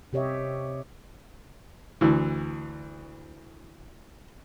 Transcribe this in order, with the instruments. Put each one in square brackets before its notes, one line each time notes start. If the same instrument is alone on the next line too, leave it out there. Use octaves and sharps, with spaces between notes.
[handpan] C3 G4 C#5 D#5 E5
[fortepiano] D2 E3